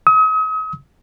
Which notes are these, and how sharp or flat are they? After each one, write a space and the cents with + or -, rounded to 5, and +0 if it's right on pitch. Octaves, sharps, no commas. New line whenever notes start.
D#6 +40